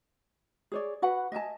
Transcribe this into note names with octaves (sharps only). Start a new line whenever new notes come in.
G#4 C#5 D5
F#4 B4 F#5 B5
D#5 E5 G#5 A5